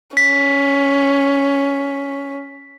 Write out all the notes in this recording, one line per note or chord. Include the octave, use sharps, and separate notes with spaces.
C#4 B6